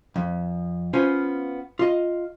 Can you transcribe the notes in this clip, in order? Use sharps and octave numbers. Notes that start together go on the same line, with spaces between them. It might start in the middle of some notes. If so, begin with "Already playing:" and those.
F2
B3 C#4 F4 C5 G#5
F4 D#5